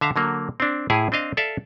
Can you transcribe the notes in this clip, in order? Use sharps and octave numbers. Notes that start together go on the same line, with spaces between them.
D3 E5 F5 A#5
D3 F#3 A#3
C4 D4
A2 E4 G#4 F5 G#5
C4 D4 D#5 F5
A4 D5 E5 F5